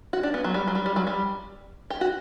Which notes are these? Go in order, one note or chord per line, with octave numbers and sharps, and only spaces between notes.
F#4
D4
B3
F#3
G3
F#3
G3
G3
F#3
G3
G4
F#4